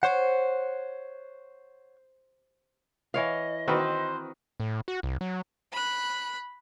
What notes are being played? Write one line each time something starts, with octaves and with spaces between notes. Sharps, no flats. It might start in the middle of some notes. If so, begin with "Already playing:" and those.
C5 C#5 F#5
E3 C#5 D#5 F5
D#3 C4 F#4 B4 C5
A2
F#4
C2
F#3
B5 F#6